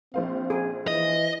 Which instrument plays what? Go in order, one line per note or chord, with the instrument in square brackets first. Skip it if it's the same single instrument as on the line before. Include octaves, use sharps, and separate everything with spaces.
[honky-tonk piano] A#1 C5 F5 [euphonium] C4
[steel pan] G#4
[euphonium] E3 [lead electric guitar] D#5